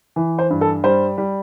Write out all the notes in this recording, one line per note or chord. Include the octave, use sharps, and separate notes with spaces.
E3
C5
G2
A4
G3 C5
G3